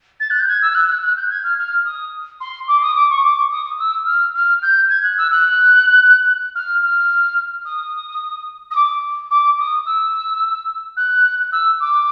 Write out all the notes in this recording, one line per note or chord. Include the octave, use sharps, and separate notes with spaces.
A6
F#6
G6
G#6
E6
F#6
F#6
F#6
G6
G#6
F6
F6
D#6
C6
D6
D#6
D6
C#6
D6
D#6
E6
F6
F6
G6
G#6
F#6
E6
F#6
F6
F6
D#6
D#6
D6
D6
D#6
E6
F#6
E6
D6